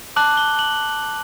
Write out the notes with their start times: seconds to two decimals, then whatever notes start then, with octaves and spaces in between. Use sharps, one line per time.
0.16 A5 D6 F#6 F#7
0.37 G7
0.59 F#7